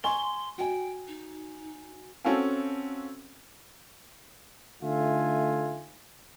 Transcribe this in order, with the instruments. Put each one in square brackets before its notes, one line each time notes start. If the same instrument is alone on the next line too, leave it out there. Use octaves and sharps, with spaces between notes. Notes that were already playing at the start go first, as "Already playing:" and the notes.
[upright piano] G#5 C#6 G7 [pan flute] C6
[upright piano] F#4 G#5 [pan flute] G5
[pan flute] D#4
[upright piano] C4 C#4 F#4 A4 F5 G#5
[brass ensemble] D3 A3 D#4 F4 E5 G#5